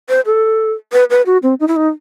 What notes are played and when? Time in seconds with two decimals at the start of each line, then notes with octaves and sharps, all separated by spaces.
0.09 C5
0.26 A4
0.93 B4
1.10 B4
1.26 F#4
1.43 C4
1.60 D#4
1.68 E4
1.77 D#4